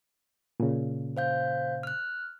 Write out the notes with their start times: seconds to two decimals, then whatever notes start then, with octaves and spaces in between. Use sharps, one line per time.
0.60 A#2 C#3
1.17 C5 F5 G6
1.83 F6 F#6